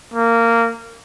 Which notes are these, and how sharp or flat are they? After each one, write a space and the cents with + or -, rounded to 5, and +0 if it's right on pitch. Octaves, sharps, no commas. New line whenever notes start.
A#3 -15